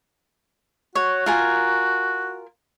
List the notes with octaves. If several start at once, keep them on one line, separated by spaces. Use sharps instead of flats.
F#4 C#5
F4 A#4 G#5